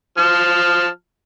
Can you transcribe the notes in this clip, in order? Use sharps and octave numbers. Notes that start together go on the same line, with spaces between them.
F3 A5 F6